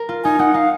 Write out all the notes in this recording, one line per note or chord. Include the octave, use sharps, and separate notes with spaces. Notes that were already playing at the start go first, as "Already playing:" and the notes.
Already playing: A#4
F4
D#4 G#5
D#4 F#5
D#4 F5